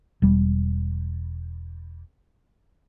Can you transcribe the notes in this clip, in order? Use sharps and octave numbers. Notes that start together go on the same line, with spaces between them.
E1 G3